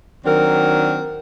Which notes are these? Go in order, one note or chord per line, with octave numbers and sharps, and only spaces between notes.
D#3 F#3 C4 D4 A#4